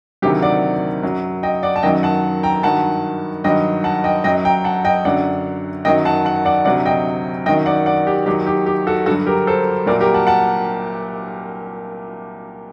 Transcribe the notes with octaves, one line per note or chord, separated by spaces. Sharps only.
D2 C3 D#3 F#3 G4
D5 F#5
F#2 F#3
D#5 G5
D5 F#5
A5
F#2 D#3 F#3 D#5 G5
F#5 A5
G5 A#5
G2 D#3 F#3 F#5 A5
G2 D#3 F#3 D#5 G5
F#5 A5
D#5 G5
F#2 F#3 D#5 G5
G5 A#5
F#5 A5
D#5 G5
F#2 D3 F#3 D5 F#5
F#2 D#3 F#3 D#5 G5
F#5 A5
F#5 A5
D5 F#5
D2 C3 F#3 D5 F#5
D#5 G5
F#2 D#3 F#3 D#5 G5
D5 F#5
D5 F#5
G4
D#2 D#3 F#3 G4
G4
G4
F#4 A4
G2 D3 F#3 F#4 A4
G4 A#4
A4 C5
C2 A#2 F#3 A#4 D5
G4 A#4
F#5 A5
F#5 A5